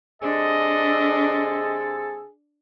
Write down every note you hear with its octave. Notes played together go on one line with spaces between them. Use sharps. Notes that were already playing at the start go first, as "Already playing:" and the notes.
C3 G#3 D4 G#4 A4 D#5